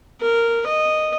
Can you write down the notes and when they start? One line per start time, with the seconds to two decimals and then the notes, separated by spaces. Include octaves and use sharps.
0.21 A#4
0.66 D#5